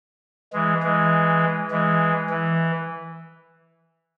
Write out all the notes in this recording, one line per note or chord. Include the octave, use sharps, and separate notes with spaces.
E3 G#3
E3 G#3
E3 G#3
E3